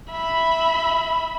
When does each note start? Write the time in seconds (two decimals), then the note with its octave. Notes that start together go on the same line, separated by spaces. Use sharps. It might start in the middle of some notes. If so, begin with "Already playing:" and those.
0.11 E5 B5